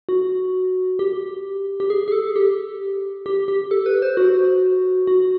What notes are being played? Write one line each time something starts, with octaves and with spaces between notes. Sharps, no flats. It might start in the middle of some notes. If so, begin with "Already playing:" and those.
F#4
G4
G4
G#4
G#4
A4
G4
G4
G4
A4
B4
C5
F#4
F#4